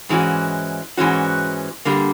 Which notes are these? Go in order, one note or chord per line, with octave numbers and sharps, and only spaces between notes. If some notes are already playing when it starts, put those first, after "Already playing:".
G#2 E3 G#3 C#4 F#4
G#2 E3 G#3 C#4 F#4
D3 G3 A#3